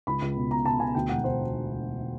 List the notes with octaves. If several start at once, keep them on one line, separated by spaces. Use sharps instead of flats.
C#2 B5
C#2
B2
B2 A#5
B2 A5
B2 G#5
D2 G5
E1 F#5
E1 C5